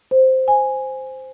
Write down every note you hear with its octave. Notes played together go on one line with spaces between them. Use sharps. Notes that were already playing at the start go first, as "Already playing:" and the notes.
C5
G#5